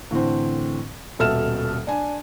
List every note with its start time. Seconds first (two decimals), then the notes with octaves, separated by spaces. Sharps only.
0.11 A2 D3 E3 C4
1.19 D#1 B2 A4 E5 F6 E7
1.87 D4 G#5